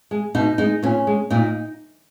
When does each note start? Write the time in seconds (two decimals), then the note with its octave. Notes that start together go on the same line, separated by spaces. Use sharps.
0.11 G#3
0.35 B2 D#4
0.58 G#3 D#4
0.83 A#2 C#4
1.07 G#3
1.30 A#2 D#4